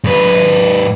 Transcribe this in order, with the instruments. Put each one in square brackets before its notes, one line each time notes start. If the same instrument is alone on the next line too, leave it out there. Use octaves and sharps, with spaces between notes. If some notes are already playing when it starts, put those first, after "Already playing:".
[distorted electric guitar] G#2 B4